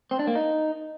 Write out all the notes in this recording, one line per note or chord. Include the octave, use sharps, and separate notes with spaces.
C4
D4
A#3
D#4